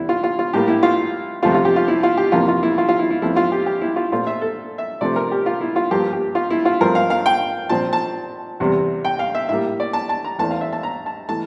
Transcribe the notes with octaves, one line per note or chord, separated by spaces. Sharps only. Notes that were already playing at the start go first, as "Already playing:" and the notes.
Already playing: E2 C3 E4
F4
F4
F4
A2 G3 A#3 G4
E4
F4
F2 C3 F3 A3 C4 F4
F4
G4
F4
E4
F4
G4
F2 C3 E3 A#3 F4
F4
E4
F4
F4
E4
E4
F2 E3 A3 C4 E4
F4
G4
G4
E4
F4
A#2 A3 C4 F4
E5
A4
E5
C3 F3 A3 C4 D5
A#4
G4
F4
E4
F4
G2 F3 A#3 G4
G4
F4
E4
F4
G2 F3 A3 C4 A#4
F5
F5
G5
A#2 F3 C4 A5
A5
E2 C3 G3
G5
F5
E5
A2 G3 A#3 E5
D5
A5
A5
A#5
E2 E3 A3 C4 A5
F5
E5
A5
A#5
A5
E3 A3 A5